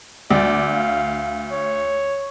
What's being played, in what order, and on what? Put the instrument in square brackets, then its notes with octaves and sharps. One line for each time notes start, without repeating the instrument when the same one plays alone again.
[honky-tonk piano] D2 [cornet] D5
[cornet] F5
C#5